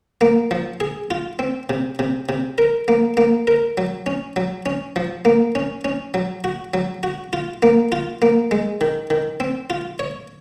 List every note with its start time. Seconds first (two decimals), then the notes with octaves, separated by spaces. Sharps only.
0.21 A#3
0.51 F3
0.80 G#4
1.11 F4
1.39 C4
1.70 C3
1.99 C3
2.29 C3
2.58 A#4
2.88 A#3
3.17 A#3
3.47 A#4
3.78 F#3
4.06 C#4
4.36 F#3
4.66 C#4
4.96 F3
5.25 A#3
5.55 C#4
5.85 C#4
6.14 F#3
6.44 F#4
6.74 F#3
7.03 F#4
7.33 F4
7.63 A#3
7.92 F4
8.22 A#3
8.51 G#3
8.81 D#3
9.10 D#3
9.40 C4
9.70 F4
9.99 C#5